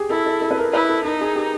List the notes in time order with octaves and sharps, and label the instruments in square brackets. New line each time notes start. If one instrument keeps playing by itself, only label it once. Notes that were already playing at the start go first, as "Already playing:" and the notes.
Already playing: [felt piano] G4 G#4
[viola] E4 [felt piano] A4
[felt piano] A4
A4
B4
A#4
[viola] E4 [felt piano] B4
[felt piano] A4
[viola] D#4 [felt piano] A#4
[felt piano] G#4
G4